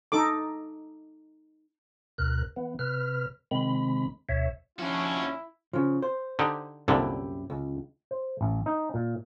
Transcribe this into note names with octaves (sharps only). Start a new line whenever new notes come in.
D#4 A4 D6
D2 B2 A#4 F#6
E3 B3
C3 B4 F6
C3 D#3 G#3 C4 B5
D2 B2 C#5 E5
D#2 F3 C#4 D4 E4 F#4
C#3 F3
C5
D3 D#4 G4
C2 F#2 A#2 D3 E4 G4
C#2
C5
A1
D#4
A#2